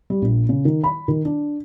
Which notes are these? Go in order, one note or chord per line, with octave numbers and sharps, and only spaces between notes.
G3
A#1
C#3
D#3
B5
D#3
D4